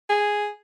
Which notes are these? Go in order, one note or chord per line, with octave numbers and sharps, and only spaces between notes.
G#4